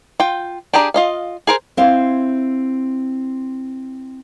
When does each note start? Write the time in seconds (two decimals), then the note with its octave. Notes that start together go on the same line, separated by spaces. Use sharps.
0.20 F4 G5
0.73 D4 G4 G#4 A#5
0.94 F4 D#5 F5
1.47 G#4 A#4 C5
1.77 C4 E4 C5 F5